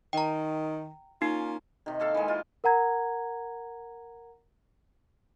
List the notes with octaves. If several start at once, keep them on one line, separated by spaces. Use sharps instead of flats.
D#3 G5 A#5
A#3 C#4 D#4 F4
C3 D#3
A#3 A4 F5
E3 G#3
F4
A#4 F#5 A#5 G#6